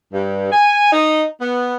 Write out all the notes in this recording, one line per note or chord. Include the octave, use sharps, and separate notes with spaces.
G2
G#5
D#4
B3